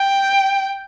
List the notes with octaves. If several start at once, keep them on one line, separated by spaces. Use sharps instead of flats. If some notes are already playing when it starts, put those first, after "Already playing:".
Already playing: G5